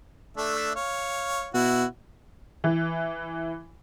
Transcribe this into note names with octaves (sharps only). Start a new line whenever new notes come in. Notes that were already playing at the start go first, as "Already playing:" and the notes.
A3 D4 E5
C#5 F5
B2 E4 F#4
E3